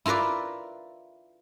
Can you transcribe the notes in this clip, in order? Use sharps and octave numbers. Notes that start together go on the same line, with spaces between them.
E4 F4 A#4 B4 D5